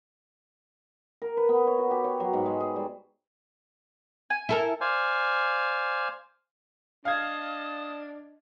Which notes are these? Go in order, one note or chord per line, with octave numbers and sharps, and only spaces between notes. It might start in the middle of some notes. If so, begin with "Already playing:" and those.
A#4
B4
B3
C#5
F#4
G4
C#5
F#3
G#2
G#3
G#4
G3
G#5
E4 A4 A#4
C5 D5 F5 G#5
D4 D#5 F5 A5 D#6 G#6